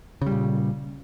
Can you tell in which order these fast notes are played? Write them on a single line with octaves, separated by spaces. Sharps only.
C#3 G3 A#2